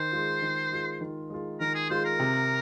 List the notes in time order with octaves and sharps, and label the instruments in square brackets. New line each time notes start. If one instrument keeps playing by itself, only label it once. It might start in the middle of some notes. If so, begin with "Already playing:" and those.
Already playing: [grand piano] D#3 [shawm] C5
[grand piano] G#3 F4
D#3
G#3 F4
D#3
G#3 F4
[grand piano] D#3 [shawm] A#4
[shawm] G#4
[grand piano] G#3 F4 [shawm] C5
[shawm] A#4
[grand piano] C3